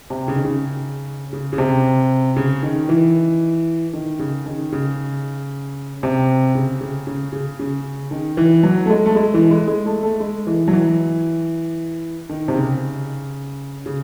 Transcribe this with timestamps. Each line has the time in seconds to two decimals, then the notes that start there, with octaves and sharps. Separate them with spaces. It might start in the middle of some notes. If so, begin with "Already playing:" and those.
0.10 C3
0.28 C#3
0.36 D#3
0.45 C#3
1.33 C#3
1.53 C#3
1.58 C3
2.36 C#3
2.63 D#3
2.89 E3
3.93 D#3
4.19 C#3
4.46 D#3
4.72 C#3
6.03 C3
6.55 C#3
6.81 C#3
7.07 C#3
7.33 C#3
7.59 C#3
8.11 D#3
8.37 E3
8.63 F#3
8.86 A3
8.90 G#3
9.06 A3
9.16 G#3
9.34 E3
9.51 G#3
9.68 G#3
9.86 A3
10.03 A3
10.20 G#3
10.47 E3
10.68 F#3
10.73 E3
12.29 D#3
12.48 C3
12.56 C#3
13.86 C#3